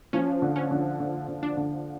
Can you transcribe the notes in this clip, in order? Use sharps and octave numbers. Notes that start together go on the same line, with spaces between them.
F3 C#4
D3
C#4
D3
D3
D3
D4
D3